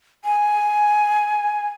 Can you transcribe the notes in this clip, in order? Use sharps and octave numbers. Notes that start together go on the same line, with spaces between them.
G#5